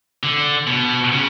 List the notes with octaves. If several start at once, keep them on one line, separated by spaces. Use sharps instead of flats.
D3
B2
C#3